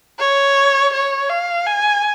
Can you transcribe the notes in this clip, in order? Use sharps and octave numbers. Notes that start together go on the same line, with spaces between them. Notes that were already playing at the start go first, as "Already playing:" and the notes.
C#5
C#5
F5
G#5